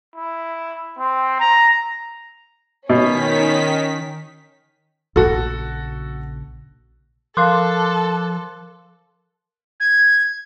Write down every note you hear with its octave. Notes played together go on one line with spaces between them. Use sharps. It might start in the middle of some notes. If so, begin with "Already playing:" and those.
E4
C4
A#5
B2 D#3 C#4 B6
A#1 C#3 F#4 A4
F3 A4 A#4 F5 C6 D6 F#6
G#6